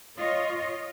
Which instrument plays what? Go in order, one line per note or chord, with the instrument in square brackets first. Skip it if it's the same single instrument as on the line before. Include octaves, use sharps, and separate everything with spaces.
[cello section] F4 C#5 D#5